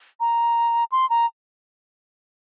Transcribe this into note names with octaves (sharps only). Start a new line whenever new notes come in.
A#5
C6
A#5